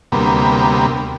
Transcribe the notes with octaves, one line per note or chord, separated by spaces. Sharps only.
D2 C3 G3 A#3 B3